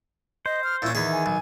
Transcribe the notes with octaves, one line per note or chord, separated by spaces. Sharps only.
C5 D#5
F6
A#2 C#4 E4
E2 D#3 G#4 E5
G#5
B1